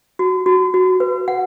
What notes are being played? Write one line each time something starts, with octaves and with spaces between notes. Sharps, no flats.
F#4
F#4
F#4
B4
F#5